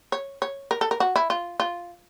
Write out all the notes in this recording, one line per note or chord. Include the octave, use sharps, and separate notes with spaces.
C#5
C#5
A#4
A4
A#4
F#4
E4
F4
F4